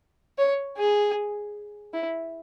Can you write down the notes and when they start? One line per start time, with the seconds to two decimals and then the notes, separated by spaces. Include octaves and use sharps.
0.38 C#5
0.77 G#4
1.94 E4